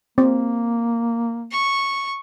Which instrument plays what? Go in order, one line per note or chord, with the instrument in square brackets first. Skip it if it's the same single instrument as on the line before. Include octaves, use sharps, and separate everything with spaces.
[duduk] A#3 [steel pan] C4
[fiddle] C#6